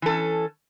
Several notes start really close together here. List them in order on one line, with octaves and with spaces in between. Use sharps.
E3 A4 C#4